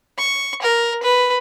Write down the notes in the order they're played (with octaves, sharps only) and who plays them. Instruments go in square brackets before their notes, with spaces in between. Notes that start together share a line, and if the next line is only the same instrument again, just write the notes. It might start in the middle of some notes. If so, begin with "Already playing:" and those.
[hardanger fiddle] C#6
A#4
B4